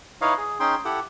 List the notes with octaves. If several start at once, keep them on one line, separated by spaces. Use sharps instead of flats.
D#4 E4 B4 C#5 D#5 F5
G#4
C#4 D#4 G#4 G5 C6
E4 G4 A4 F#5